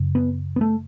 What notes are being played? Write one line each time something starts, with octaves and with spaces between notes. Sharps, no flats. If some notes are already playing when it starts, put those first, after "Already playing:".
Already playing: F#2 C#3
B3
B3
A3